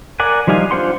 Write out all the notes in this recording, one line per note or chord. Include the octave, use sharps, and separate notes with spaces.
A#4 D5 F#5 G#5
F3 G3 D#4 F5 G#5
D4 F4 C5 F#5 C6